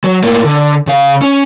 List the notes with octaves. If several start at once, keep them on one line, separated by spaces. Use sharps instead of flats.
F#3
A2 A#3
D3
C#3 F5
C#4